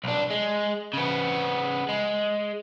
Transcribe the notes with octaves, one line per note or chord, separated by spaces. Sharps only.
B1 D4
G#3
C#3 B3
G#3